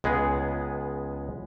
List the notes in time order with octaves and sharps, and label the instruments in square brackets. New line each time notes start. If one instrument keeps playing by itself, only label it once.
[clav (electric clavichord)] C#2 G#3 B3 G#4